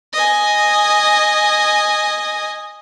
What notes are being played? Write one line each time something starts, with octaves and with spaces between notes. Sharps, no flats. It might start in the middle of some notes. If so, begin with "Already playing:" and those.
D#5 G#5